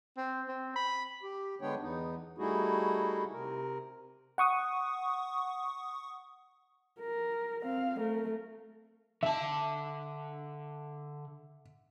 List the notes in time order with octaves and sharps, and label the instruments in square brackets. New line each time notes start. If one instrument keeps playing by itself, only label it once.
[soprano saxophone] C4
C4
B5
[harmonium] G4
D3 G#3 B3 D4 C#5 G5
E2 B3 D#4
G3 A3 D#4 E4 F#4 G#4
C3 A#4
[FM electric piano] F#5 C#6 D#6
[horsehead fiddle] A#4
C4 F5
A3 A#4
[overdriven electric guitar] D3 A5 [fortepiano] E5